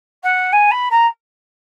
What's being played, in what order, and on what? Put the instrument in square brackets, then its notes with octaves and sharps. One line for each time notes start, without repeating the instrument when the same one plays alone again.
[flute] F#5
G#5
B5
A#5